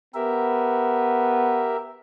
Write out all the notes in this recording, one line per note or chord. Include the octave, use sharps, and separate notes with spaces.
B3 G4 A#4 E5